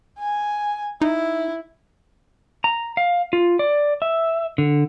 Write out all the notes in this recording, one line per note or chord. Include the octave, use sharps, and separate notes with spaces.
G#5
D#4 E4
A#5
F5
F4
D5
E5
D3